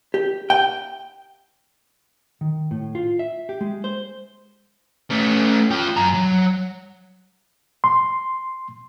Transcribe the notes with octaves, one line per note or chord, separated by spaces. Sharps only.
G4
G5
D#3
A2
F4
E5
G4
G#3
C5
A3 C#4
F4 G5
F#2 A#5
F#3
C6